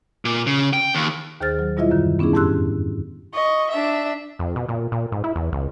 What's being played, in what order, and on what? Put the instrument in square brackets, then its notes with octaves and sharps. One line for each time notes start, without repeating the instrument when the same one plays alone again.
[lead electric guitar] A#2
C#3
G5
D#2
[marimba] D#2 D#3 G#4 C5 F6 A6
F#3
B2 G3 E4 F4 D#5 E5
F#2 D3 D#3
B3 C#4 D4 E4 G#4
F2 G#2 G4 C6 E6 F#6
[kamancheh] D#5 C#6
D4 E5
[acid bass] F2
B2
A#2
A#2
G#2
E4
E2
C#2